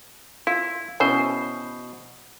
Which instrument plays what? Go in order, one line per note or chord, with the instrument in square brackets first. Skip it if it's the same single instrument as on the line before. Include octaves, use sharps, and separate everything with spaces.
[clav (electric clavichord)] E4 [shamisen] F4
[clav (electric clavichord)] B2 C5 [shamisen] E3 C#4